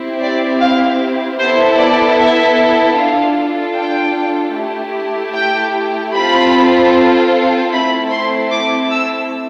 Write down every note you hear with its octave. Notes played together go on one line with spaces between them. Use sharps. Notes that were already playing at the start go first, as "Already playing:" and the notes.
Already playing: C4 E4 G4
D5
F5
B3 E4 A4 C5
D5
E5
D4 F4 A4 F5
G5
A3 E4 G4
G5
C4 F4 A4 B5
A3 C4 E4 A4 B5
C6
D6
E6